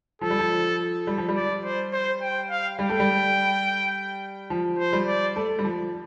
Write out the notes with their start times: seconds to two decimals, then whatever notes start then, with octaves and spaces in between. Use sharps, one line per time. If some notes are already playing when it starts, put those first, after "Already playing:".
0.21 F3 A4
0.30 G3
0.39 F3
1.07 G3
1.18 F3
1.29 G3
1.35 D5
1.64 C5
1.93 C5
2.22 G5
2.50 F5
2.79 G3 G5
2.89 A3
3.00 G3
4.50 F3
4.79 C5
4.93 G3
5.07 D5
5.36 A3
5.59 G3
5.64 F3